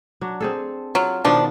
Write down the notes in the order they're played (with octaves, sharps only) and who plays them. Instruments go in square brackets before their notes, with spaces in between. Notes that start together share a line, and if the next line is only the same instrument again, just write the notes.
[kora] F#3 D4
C4 G#4 A4
[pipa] F#3 [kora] F4
[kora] B2 D#3 B3 [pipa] F3 D4